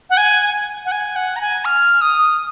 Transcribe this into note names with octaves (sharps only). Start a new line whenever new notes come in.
F#5
G#5
F#5
G#5
F#5
A#5
G#5
F6
D#6